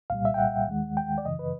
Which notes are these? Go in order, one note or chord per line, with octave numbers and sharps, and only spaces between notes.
C2 A#2 G3 F5
E5
G5
F#5
D#2 D#3 G#3
G5
D5
F#2 C#3 E3 D#5
B4